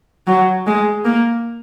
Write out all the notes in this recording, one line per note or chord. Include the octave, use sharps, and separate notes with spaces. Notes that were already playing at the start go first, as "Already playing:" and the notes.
F#3
G#3
A#3